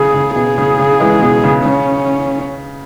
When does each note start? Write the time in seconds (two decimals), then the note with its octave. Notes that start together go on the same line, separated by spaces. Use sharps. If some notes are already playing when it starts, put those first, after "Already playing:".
Already playing: C#3 G#4
0.14 C#3
0.36 B2 G#4
0.58 C#3
0.79 C#3
1.00 E3 G#3
1.22 B2
1.44 C#3
1.65 C#3 C#4